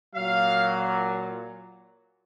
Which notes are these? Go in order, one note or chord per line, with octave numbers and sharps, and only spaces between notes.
A#2 F#3 F5